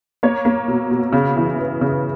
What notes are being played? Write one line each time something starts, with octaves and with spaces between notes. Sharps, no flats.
A#3 C#5
A#3
B2
B2
C#3
E3
B3
C#3